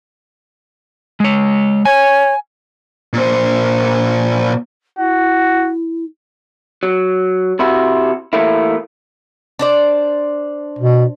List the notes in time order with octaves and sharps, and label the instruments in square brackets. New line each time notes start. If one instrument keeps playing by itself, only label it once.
[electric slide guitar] G#3 C#5
[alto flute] C#5 [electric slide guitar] G#5
[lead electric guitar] A#2 C5
[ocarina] E4 [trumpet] F#4
[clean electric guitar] F#3
C3 E4 F#4
E3 A3 A#3 E4
[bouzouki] D4 C5 D5
[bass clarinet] B2